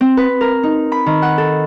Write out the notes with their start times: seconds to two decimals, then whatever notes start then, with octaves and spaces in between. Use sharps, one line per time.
0.01 C4
0.17 B4
0.41 A#4
0.63 D#4
0.92 B5
1.06 D#3
1.22 F#5
1.38 A4